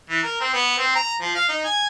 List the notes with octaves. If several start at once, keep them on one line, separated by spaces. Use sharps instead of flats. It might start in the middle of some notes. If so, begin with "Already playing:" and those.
E3
A#4
C4
B3
C4
A#5
F3
F5
D#4
G#5